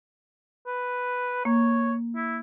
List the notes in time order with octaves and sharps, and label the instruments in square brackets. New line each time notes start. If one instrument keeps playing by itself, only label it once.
[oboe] B4
[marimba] A#3 [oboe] C#5
[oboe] E4